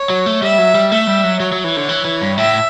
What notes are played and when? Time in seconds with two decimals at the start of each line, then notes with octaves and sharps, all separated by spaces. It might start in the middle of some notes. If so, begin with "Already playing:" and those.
Already playing: C#5
0.10 F#3
0.26 A3
0.42 G3 E5
0.58 F#3
0.75 G3
0.91 A3 E5
1.07 G3
1.24 F#3
1.39 F#3 C#5
1.52 F#3
1.64 E3
1.77 D3
1.89 E3
2.05 E3
2.21 G2
2.37 A2 E5